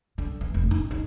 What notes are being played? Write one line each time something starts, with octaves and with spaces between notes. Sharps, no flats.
D3
E3
F1
D#4
D#4